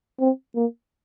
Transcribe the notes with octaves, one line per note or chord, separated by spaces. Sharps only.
C4
A#3